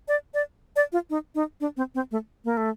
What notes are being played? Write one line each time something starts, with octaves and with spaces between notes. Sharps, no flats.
D5
D5
D5
F4
D#4
D#4
D4
C4
C4
A3
A#3
A3